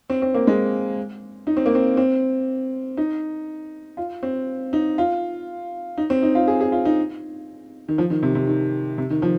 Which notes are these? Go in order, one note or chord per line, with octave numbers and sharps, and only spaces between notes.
C4
C4
A#3
G#3
D#4
C4
A#3
C4
C4
D#4
F4
C4
D#4
F4
D#4
C4
D#4
F4
G#4
G#4
F4
D#4
D#3
F3
D#3
C3
C3
D#3
C3
D#3
F3